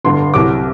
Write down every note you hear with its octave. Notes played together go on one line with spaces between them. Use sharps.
G1 G2 D3 G3 C6
C2 C3 F#3 D6